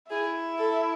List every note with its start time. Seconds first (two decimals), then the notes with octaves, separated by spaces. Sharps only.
0.10 E4 G#4
0.59 A4